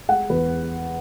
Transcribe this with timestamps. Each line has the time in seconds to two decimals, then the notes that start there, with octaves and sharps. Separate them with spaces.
0.09 G#3 F#5
0.30 E2 B4